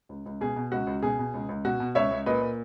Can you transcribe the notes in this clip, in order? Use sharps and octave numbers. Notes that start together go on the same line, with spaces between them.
C#2
C#2
B2 G#4
B2
C#2 F#4
C#2
B2 G#4
B2
C#2
C#2
B2 F#4
B2
C#2 C#5 E5
C#2
A#2 B4 D#5
A#2